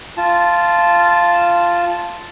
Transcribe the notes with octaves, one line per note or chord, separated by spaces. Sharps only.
F4 A5